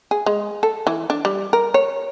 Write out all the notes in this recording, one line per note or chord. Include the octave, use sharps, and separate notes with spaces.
G#4
G#3
A4
E3
D4
G3
A#4
C#5